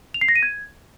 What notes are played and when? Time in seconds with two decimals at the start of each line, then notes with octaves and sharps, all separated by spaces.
0.14 F7
0.21 C7
0.28 A#6
0.36 D#7
0.43 G#6